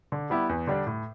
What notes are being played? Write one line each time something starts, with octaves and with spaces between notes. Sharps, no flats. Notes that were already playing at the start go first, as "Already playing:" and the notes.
D3
G3 B3 E4 G4
E2
D3 G3 D4
A2